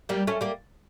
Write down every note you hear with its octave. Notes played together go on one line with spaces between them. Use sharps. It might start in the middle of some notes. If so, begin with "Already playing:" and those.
G3 A#3
A3 C#4
G3 A#3